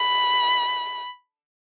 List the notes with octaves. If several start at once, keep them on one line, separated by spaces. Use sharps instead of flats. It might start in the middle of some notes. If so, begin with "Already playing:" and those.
Already playing: B5